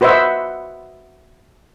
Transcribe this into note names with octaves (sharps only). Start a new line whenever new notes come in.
F#4 B4 C5 D#5 E5 F#5